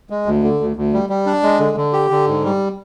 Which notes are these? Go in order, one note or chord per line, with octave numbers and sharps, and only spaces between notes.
G#3
D2
D3
D2
D2
G3
G3
D4
G#3
D3
D3
G4
D3
G#2
G3